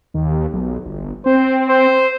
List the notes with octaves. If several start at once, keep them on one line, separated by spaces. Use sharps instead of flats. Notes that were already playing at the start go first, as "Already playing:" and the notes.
D#2
B1
G1
C4 C5
C5